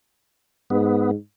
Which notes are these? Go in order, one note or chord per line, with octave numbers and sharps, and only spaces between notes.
G#2 B3